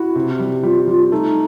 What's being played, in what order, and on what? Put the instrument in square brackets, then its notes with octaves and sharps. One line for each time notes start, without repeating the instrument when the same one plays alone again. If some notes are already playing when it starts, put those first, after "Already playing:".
Already playing: [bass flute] E4 [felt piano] F#4
[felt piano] C3
G3
[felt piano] G3 [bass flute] F4
[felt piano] G3 [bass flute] F4
[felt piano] A3 [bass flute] D#4